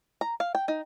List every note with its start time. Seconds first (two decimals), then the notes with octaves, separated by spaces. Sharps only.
0.21 A#5
0.40 F5
0.55 G5
0.68 D#4